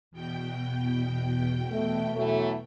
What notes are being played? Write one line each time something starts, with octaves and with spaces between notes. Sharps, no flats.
E2 B2 G5
A3
E3 F#3 A3